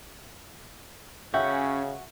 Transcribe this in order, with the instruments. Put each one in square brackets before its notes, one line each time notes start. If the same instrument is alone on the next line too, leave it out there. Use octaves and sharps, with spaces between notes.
[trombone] C#3 [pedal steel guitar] C#4 G6 [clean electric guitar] F#4 [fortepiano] E5 G5